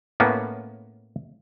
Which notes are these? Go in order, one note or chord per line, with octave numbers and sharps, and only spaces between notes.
A2 A#3 B3 C#4